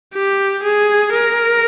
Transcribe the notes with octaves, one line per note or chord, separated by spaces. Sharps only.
G4
G#4
A#4